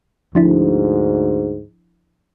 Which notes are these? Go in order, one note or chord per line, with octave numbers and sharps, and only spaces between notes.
D2 G#2 F3 D4 E4